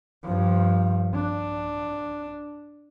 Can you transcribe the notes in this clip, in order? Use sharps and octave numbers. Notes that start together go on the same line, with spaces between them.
G2 F3
D4